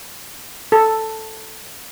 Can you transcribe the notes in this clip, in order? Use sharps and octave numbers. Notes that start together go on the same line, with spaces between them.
A4